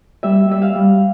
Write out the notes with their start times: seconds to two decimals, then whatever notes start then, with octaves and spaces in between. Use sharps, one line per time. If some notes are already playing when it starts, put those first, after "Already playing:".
0.23 G3 E5
0.49 G3 E5
0.62 F5
0.75 G3